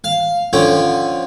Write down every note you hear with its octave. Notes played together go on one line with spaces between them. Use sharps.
F5
D3 F3 C#4 G5